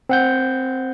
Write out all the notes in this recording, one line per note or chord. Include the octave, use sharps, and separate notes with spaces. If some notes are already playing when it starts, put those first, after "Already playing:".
C4 F#5 G6